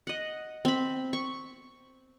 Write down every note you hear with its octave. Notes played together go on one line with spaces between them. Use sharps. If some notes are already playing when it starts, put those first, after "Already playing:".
D#5 F#5
C4 B5
C#6